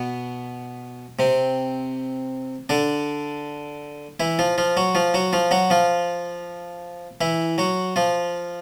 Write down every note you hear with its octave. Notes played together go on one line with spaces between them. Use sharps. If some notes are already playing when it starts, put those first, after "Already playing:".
Already playing: B2 B3
C3 C4
D3 D4
E3 E4
F3 F4
F3 F4
F#3 F#4
F3 F4
F#3 F#4
F3 F4
F#3 F#4
F3 F4
E3 E4
F#3 F#4
F3 F4